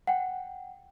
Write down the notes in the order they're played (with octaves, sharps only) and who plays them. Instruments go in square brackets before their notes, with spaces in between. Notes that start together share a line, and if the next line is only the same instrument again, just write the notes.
[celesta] F#5 G5